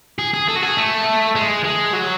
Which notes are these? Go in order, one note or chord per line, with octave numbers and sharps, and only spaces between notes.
G#4
G#4
A4
F#4
G#4
A3
G#3
G#3
F#3